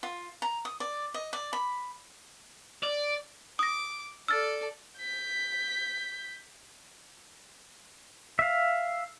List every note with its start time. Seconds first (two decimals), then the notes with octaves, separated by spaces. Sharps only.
0.03 F4
0.42 A#5
0.65 D#6
0.80 D5
1.14 D#5
1.33 D5
1.53 B5
2.83 D5
3.59 D6 D#6 A#6
4.28 A4 D5 E6 F6 A6
4.99 G6 B6
8.39 E5 F5